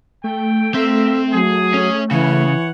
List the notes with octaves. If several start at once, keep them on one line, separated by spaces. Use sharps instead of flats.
A3 G5
A#3 C4 A4 E5
F#3 G#4
C#4 C#5
C#3 E3 C#5 F#5